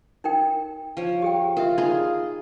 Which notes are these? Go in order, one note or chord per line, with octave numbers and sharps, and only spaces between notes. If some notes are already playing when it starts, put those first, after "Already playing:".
D#4 A#4 G5
F3 C#5
G4 G#4 G5
F4 A#4 E5
D#4 F4 G#4 D5 B5